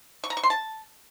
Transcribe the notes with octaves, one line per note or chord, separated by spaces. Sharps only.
C#6
A#5
C#6
C6
A5